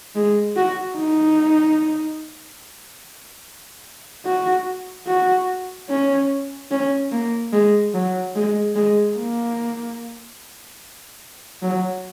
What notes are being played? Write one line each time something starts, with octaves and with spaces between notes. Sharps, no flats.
G#3
F#4
D#4
F#4
F#4
C#4
C#4
A#3
G#3
F#3
G#3
G#3
A#3
F#3